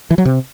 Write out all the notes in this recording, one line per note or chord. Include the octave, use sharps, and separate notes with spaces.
E3
F#3
C3